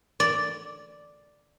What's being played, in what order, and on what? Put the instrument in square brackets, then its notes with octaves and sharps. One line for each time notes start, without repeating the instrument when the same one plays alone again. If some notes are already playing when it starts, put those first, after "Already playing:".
[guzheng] D5